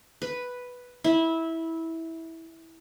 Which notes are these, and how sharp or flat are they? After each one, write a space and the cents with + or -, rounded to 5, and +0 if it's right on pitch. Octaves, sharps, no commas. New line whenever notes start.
B4 +0
E4 -15